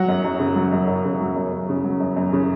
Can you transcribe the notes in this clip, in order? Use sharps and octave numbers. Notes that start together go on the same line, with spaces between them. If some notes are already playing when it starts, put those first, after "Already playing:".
Already playing: F#3 F#5
F#2
F#2
C#3
F#3
F#2
F#2
C#3
F#3
F#2
F#2
C#3
F#3
F#2
F#2
C#3